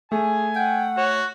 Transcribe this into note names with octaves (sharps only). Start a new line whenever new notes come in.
A3 G#4 G#5
F#5 G5
F#4 C#5